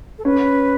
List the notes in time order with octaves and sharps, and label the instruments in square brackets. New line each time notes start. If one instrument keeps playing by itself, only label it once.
[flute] A4
[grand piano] C#4 [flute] B4